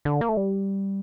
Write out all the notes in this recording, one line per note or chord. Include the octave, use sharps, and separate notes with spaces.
D3
A#3
A3
G3